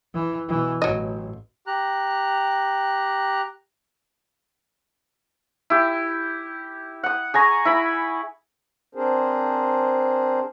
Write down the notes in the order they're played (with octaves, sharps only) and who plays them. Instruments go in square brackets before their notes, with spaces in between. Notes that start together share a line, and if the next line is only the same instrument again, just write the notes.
[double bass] E3
B2 E3
[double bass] A1 [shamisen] F#3 D#5
[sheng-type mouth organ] G4 A#5 F#6
[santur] E4 G4
F#5 D#6
G#4 G#5 A#5 C#6
E4 B5 D#6
[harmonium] C4 D4 G#4 A#4 C5